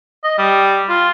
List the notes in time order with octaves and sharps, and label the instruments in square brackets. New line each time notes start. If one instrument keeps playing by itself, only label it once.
[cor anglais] D#5
G3
F4